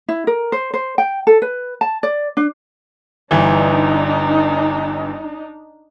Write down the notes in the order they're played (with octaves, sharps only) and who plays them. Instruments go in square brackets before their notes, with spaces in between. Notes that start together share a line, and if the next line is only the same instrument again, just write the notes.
[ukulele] E4
A#4
C5
C5
G5
A4
B4
A5
D5
D4
[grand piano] G1 E3 [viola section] D4 D#4